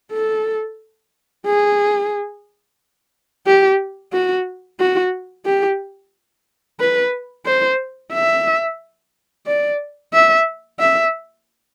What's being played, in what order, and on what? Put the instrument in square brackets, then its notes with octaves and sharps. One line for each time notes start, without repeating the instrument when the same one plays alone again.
[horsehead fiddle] A4
G#4
G4
F#4
F#4
G4
B4
C5
E5
D5
E5
E5